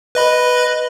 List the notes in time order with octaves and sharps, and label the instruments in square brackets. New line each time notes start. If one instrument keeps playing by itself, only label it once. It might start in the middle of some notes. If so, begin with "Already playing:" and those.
[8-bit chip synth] B4 D#5 B5